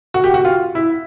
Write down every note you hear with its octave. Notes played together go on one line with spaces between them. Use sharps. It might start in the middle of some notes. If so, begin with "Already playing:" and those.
F#4
G4
F#4
F4
E4